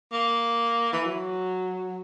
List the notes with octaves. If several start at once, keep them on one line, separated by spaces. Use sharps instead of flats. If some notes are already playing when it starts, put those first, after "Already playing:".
A#3
E3
F#3